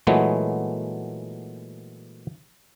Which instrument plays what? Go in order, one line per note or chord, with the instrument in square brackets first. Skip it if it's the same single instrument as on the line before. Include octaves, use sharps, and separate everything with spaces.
[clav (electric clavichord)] A#2 E3 F#3 G#3 A3 B3